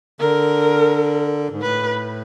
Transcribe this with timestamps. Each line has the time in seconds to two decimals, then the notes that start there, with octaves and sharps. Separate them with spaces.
0.20 D3 A#4
1.51 G#2
1.62 A2 B4